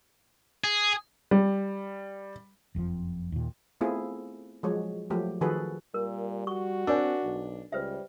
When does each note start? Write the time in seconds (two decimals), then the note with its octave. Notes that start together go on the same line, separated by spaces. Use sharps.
0.64 G#4
1.31 G3
2.75 F#1 F2 C3 F3
3.32 D#2 A#2
3.81 A3 B3 C4 E4 F4 G#4
4.63 F3 F#3 G#3 F#4 C#5
5.10 F3 F#3 A3 G4
5.41 D#3 F3 F#4 G#4 A4 B4
5.94 A#2 G3 A#4
6.47 F#4 C#6
6.87 C4 D4 A#4 C#5 G#5
7.23 B1
7.72 C#2 G3 B4 C5 E5